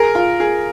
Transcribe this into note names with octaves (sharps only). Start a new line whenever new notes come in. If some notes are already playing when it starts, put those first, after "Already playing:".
Already playing: G#4 A#4
F4
G#4